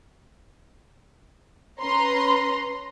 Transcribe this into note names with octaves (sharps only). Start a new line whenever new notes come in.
C#4 B4 A#5 C6